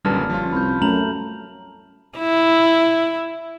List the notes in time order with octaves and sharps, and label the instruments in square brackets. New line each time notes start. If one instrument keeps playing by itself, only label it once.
[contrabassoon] D#1 [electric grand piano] F#2 A#2 D3 [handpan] G3 B4 [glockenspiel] A5 F6
[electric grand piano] F3 C#4 F4
[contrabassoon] C2 [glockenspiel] B5 G6
[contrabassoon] F#2 [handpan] A3 [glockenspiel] A#5 F7 F#7
[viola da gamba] E4